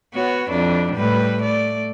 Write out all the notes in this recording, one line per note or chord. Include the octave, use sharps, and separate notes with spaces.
B3 F#4 C#5
F2 D4 E4
A2 G3 B4
A3 D5